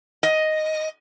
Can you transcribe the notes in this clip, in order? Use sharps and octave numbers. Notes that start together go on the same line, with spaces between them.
D#5